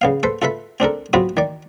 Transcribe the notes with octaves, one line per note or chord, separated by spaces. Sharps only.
C#3 B3 F5
A4 B4 C5
F4 A4 B4 E5 B5
C4 D4 A4 A#4
F#3 B3 C4 F4 F#4 B4
D#3 D5